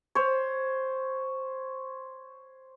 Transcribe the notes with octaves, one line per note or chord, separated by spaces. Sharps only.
C5 C#5